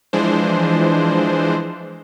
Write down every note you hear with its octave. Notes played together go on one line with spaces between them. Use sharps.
E3 F3 G#3 D4 C5